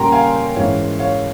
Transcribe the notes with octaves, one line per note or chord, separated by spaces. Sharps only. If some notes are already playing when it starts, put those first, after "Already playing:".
Already playing: A#2 G3 C#4 A#4 G5 A#5 C6
F5 G#5
G#2 E3 G#3 C#4 C#5 F5
C#5 F5